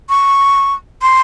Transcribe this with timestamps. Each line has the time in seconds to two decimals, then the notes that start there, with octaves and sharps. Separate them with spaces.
0.09 C#6
1.02 C6